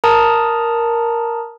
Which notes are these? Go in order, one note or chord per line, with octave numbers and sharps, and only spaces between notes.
A#4 A5 A#5 D#6